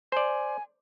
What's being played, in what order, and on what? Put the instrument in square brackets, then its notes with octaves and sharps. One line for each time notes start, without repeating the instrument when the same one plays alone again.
[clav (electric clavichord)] C5 D5 [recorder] G#5